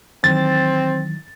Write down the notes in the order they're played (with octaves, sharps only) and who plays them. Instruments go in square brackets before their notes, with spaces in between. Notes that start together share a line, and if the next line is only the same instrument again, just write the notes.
[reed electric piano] D#3 E3 F#3 [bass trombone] C4 [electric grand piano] A6